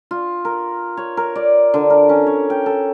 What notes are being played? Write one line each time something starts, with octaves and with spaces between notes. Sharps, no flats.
F4
A#4
C#5
A#4
D5
D3
A#4
C#4
C#5
G5
A4